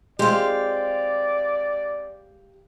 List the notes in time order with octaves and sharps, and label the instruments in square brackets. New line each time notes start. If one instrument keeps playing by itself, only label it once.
[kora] G#3 C4 F4 [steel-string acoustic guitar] G4 F5 [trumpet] D5